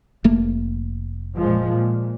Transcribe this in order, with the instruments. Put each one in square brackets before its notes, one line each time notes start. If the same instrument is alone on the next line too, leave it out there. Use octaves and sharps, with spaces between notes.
[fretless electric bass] F1 A3 A#3
[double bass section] A#2 F3 G#3
A#2